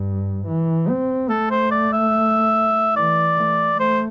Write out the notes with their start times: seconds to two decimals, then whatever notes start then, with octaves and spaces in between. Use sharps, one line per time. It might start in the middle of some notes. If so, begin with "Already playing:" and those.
Already playing: G2
0.47 E3
0.89 C4
1.29 A3 A4
1.51 C5
1.71 D5
1.93 E5
2.96 E3 D5
3.38 A3
3.79 A3 C5